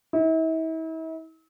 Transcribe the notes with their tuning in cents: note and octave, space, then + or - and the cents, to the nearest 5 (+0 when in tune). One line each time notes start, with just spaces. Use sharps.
E4 -40